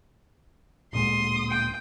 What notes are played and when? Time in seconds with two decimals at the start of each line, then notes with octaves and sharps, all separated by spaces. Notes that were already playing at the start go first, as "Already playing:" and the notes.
0.93 D1 A#2 G#3 C6 D#6
1.50 G5